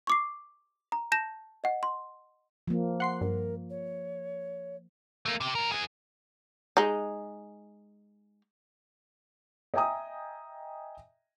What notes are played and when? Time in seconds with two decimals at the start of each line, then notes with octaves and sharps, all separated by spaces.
0.07 C#6 D6 C7
0.92 A#5
1.12 A5 G6 A#6 E7
1.64 D#5 F#5
1.83 C6
2.68 F3 A#3
3.00 F#5 C6 C7
3.21 G2 A#4
3.70 C#5
5.26 A3 A#3
5.41 C3 G4
5.55 G#2 A#4
5.72 E3 G#4
6.77 G#3 D#4
9.74 D#5 E5 G5 G#5 A#5 D#6